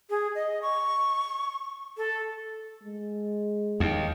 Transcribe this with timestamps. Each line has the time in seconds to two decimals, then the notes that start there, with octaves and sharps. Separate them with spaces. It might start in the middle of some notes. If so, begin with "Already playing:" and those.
0.10 G#4
0.35 D#5
0.62 C#6
1.97 A4
2.84 G#3
3.80 D#2